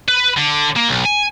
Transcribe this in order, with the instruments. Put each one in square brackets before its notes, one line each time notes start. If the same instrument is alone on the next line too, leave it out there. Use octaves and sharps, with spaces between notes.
[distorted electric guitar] B4
D3
A#3
B1
G#5